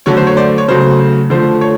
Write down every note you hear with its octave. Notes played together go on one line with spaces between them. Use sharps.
D3 F#3 A3 C#5
C5
C#5
C5 D5
C#5
C#3 F#3 A3 C5
D3 F3 A3 C5
C#5